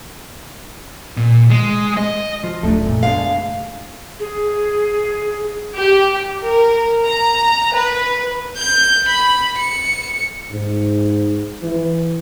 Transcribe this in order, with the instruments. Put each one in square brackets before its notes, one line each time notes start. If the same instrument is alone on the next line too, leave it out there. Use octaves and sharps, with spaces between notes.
[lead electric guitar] A#2
G#3
D#5
[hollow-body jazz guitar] F3
[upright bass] D1 G#3 [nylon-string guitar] A3 [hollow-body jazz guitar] D4 D#4 A4
[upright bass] F#2 C#3 [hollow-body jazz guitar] A#2
[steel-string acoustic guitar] B2 F5 [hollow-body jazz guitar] G#3 D4 G#4
[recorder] G#4
[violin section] G4
A#4
A#5
B4
[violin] G6
B5
C#7
[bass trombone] G#2
E3